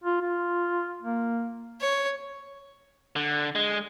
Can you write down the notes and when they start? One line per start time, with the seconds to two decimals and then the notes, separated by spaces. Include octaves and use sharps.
0.04 F4
0.22 F4
1.02 A#3
1.81 C#5
3.16 D3
3.55 G#3